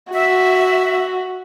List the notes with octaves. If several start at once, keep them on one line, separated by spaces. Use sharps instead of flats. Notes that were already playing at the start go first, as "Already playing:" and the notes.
F#4 E5